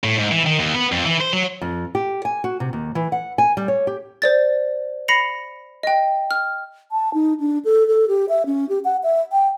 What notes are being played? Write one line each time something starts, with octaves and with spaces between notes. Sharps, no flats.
A2
G#2
E3
D#3
D#2
B3
F2
E3
C5
F#3
F2
G4
G#5
F#4
C3
D#2
E3
F#5
G#5
G3
C#5
G4
C5 D5 A6
B5 A#6 C7 C#7 F7
D#5 G5
F6
A5
D#4
D4
A4
A4
G4
E5
C#4
G4
F#5
E5
G5